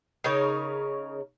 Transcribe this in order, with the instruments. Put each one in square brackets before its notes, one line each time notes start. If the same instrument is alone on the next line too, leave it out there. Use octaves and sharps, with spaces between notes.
[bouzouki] C#3 D#4 A#4 C#5